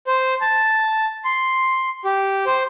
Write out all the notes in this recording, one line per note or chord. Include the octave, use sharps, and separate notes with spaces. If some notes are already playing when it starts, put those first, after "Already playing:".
C5
A5
C6
G4
C5